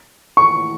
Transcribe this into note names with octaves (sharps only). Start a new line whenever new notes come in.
C#6